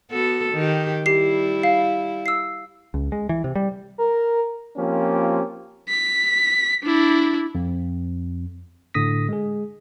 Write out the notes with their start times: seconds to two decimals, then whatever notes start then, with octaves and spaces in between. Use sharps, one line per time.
0.11 B3 F#4 A4
0.53 D#3 G4
1.06 G3 E4 G4 C7
1.63 F5
2.26 E6 C7
2.94 C#2
3.12 G#3
3.29 E3
3.44 C3
3.56 G3
3.98 A#4
4.77 F3 A#3 C4 C#4 F4 G4
5.89 B6
6.83 D4 E4
7.55 F2
8.94 A2 D3 D#6 A#6 B6
9.29 G#3 G#4